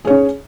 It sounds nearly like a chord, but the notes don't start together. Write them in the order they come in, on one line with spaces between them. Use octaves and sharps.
G#4 C#5 C#4